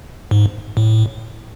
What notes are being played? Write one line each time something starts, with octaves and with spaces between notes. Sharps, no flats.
G#2
A2